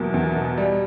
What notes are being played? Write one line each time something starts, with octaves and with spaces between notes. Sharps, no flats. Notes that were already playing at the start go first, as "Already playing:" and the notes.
Already playing: E2 B2 F#3 A#3
E2
B2
G3